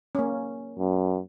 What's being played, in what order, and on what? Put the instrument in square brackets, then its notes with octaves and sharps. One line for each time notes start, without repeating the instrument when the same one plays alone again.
[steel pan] A#3 C#4
[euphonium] F#2